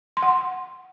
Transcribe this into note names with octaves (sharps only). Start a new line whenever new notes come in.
C6
F#5
C6